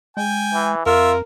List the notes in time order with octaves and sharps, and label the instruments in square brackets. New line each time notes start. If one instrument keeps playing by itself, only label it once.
[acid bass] G#3 [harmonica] G5 G#5
[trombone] E3
[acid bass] F2 [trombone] F4 [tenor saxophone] A#4 [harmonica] E5